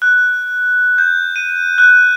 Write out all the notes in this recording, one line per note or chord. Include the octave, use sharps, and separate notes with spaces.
F#6
G6
D#7
F#6